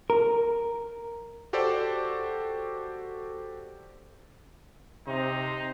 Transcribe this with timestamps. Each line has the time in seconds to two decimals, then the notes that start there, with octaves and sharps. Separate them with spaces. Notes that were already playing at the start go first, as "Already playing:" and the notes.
0.10 A#4
1.53 F#4 G4 A4 C5 D5
5.07 C3 D#4 C5